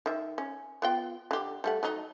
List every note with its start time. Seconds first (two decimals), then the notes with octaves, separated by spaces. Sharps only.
0.06 D#3 E5
0.38 C#4
0.82 B3 F4 G5
1.31 D3 G4
1.64 G3 A3 F#5
1.83 F#3 A3 D#4